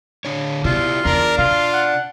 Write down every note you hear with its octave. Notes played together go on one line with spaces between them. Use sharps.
D3 D4 C#5
B2 E4 F4 G4 D5
E2 D4 A#4
B2 F4 F5
F#5